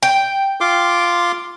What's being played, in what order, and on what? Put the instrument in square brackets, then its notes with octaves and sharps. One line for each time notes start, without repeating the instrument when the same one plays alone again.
[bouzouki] G5
[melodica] F4 C6 D6